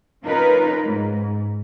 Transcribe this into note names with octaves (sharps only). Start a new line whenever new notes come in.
C#4 D#4 F4 A#4 B4
G#2